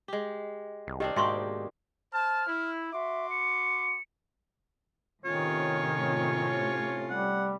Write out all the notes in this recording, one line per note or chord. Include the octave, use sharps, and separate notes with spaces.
G#3 G4
C2
D#3 C4 D4 G4
G#2 B2 A#3 G4 E5 C6 C#6
C5 A5 F6
E4
F#4 E5 C6 D6
C#7
A2 C3 D#3 A3 C#4 F4 C#5
G3 F#5